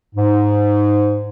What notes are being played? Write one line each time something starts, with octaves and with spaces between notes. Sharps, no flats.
G#2